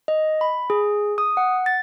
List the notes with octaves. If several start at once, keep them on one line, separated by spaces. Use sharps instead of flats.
D#5
B5
G#4
D#6
F#5
A6